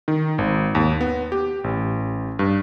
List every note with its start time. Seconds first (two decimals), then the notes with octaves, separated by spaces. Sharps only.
0.08 D#3
0.38 G#1
0.75 D#2
1.01 B3
1.32 G4
1.64 A1
2.39 G2